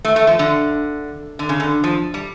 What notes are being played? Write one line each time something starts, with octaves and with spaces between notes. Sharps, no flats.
A3
A3
F3
D3
D3
C#3
D3
F3
G3